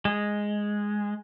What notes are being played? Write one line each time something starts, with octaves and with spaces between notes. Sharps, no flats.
G#3